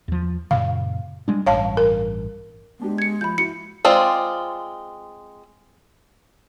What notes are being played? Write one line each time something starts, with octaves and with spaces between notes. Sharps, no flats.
E2 F3
F#2 A#2 C#3 F5
G3 G#3 D4
A1 G2 C#5 F5 A5
A#4
G#3 B3 D4 G4
G#6 C#7
F3 B5 G6
E4 F#4 C#7
G#3 C4 F4 D5